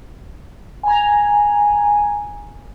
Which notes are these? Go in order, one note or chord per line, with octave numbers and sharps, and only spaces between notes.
G#5 A#5